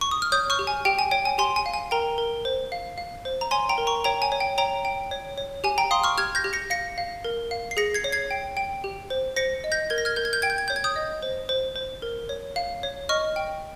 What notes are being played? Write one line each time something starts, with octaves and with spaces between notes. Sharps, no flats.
C#6
D#6
F6
C#5 D#6 G6
C#6 F6
G4
G#5
G4 G5
G#5
C#5 G5
G#5
G4 G#5 C6
G#5
F5
G#5
A#4 G5 A#5
A#4
C5
F5
F5
C5
A#5
C#5 G#5 C6
G5 A#5
A#4
A#5 C#6
C#5 G5 A#5
G#5
C#5
G5
C#5 G5 A#5
G5
C#5
C#5
G4 G#5
G5 A#5
F5 C6 D#6
C#6 F6
G4 F6 G#6
G6 A#6
G4
A#6 C#7
F5 A#6 C#7
F5
A#4
F5
C7
G#4 A#6 C#7
G#6 C7
C#5
G#6 C7
G5
G5
G4
C5
C5 A#6 C#7
D#5
G6 A#6
A#4 G#6
A#6
F6 G#6
A#4 G6
G#6
G6
G5 G#6
G6
G#6
C#5 G6
G#6
D#6 G6
D#5
C5
C5
C5
A#4
C#5
F5
C#5
D#5 C#6 F6
G5